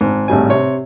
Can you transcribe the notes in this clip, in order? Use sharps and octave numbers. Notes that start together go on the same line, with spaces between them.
G#1 G#2
G#1 A2 G3 G#5
C3 C#5